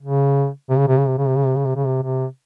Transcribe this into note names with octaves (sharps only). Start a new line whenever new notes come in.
C#3
C3
C#3
C3
C#3
C3
C#3
C3
C#3
C3
C#3
C3
C#3
C3
C3